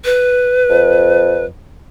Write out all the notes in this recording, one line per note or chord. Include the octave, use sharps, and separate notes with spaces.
B4
F2